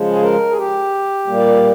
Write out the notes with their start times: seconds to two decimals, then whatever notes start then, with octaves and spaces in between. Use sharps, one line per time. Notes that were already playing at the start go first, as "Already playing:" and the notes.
Already playing: C#3 F3 G#3
0.10 G#4
0.22 A#4
0.49 G#4
0.57 G4
1.27 A#2 G3 A#3